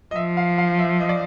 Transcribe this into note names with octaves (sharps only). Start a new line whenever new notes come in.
D#5
F3 E5
F5
F5
E5
D#5
D5